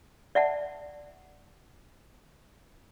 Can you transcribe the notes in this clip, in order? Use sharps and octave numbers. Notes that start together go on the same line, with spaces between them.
D5 E5 F#5 A5